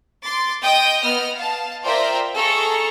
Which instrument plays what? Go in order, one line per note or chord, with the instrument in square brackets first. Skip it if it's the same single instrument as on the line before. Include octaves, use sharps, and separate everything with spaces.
[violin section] C6 D6 A6
D#5 G5 D#6 G6
B3 D#5 F6
F5 A5
F4 A#4 C5 D5 E5 G5
G#4 A4 A#5 C#6